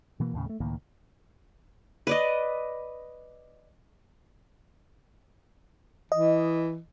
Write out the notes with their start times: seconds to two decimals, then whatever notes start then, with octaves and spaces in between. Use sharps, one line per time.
0.20 B2 E3 A#3
0.34 D#2 A2 C#3
0.46 G#3 A3
0.60 C#2 A2 D#3 A#3
2.07 B4 D5 D#5
6.12 E3 D#5